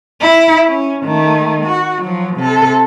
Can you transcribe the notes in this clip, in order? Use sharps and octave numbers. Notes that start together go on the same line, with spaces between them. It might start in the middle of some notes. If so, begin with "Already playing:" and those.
E4
C#4
D#3 A3
F#4
F3 F#3
C3 A4